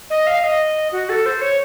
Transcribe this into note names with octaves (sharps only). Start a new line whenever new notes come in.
D#5
F5
D#5
F#4
A4
C5
C#5